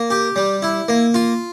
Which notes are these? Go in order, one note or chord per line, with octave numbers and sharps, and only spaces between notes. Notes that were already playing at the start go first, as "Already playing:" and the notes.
Already playing: A#3
G4
G3
E4
A#3
F4